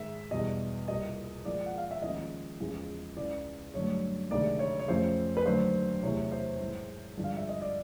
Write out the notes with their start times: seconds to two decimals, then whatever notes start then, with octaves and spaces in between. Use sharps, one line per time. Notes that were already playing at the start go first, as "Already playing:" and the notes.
Already playing: G#2 D#3 G#3 E5
0.31 E2 B2 G3 D#5
0.88 C2 A#2 G3 D#5
1.45 A#2 F3 G#3 D5
1.66 F#5
1.78 F5
1.91 E5
2.02 D#2 C#3 F3 G#3 D#5
2.60 E2 C#3 F3 G#3
3.16 C#2 C#3 E3 D5
3.74 G2 D3 F#3 A3 C#5
4.31 D2 C3 D#3 G#3 D5
4.59 C#5
4.79 C#5
4.88 F2 C#3 F3 A3 C5
5.37 B4
5.46 D#2 D3 F#3 A3 C5
6.03 E2 C3 E3 A3 C#5
6.32 C5
6.60 G#2 E3 G#3
7.17 G2 D3 F3 G#3
7.24 F5
7.37 E5
7.49 D#5
7.62 D5